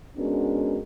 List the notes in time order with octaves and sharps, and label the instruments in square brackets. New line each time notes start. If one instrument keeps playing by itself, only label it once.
[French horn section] G#3 B3 C#4 D4 F#4 A#4